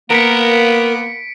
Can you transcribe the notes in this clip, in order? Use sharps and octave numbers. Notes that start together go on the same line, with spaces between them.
A#3 B3 A#4 B6 C#7 D7